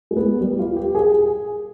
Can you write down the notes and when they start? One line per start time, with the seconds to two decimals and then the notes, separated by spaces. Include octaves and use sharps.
0.11 G#3
0.17 B3
0.41 G3
0.59 F4
0.76 G4
0.95 G#4